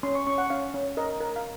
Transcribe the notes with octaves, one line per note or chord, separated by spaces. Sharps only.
C#4 C6
C#6
C#4 C#6
F#5
C#4 F5
C#4
A#4 D#5
A#4
F5